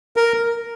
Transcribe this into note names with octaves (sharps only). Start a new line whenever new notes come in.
A#4